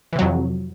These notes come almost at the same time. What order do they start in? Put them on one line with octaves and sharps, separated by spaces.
E3 C3 F#3 F2